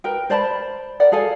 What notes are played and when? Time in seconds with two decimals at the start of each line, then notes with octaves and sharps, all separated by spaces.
0.04 A#4 B4 G5
0.30 C5 D5 A5 B5
1.00 A#4 D5 F#5
1.12 G#4 A4 F5 G#5